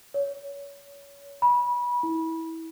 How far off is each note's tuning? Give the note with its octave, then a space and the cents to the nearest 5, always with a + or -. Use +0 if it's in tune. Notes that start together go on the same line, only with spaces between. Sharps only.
C#5 +30
B5 -25
E4 -20